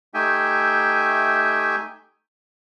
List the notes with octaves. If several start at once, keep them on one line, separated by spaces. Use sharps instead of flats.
A3 D#4 G4 E5 G5 G#5